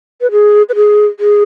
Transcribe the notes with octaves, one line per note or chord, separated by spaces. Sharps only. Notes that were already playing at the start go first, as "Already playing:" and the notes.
B4
G#4
B4
G#4
G#4